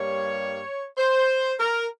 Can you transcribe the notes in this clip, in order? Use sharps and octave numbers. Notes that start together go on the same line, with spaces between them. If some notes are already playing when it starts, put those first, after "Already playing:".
Already playing: G2 G3 A#3 C#5
C5
A#4